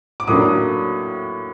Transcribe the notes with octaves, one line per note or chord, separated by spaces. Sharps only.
D6
A2 F#3 A#3 D4 D#6